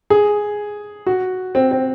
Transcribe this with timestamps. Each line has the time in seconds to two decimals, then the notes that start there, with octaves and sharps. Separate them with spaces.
0.10 G#4
1.06 F#4
1.55 C4
1.71 C4